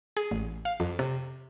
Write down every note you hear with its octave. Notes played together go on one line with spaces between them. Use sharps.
G#4
A1
F5
F2
C3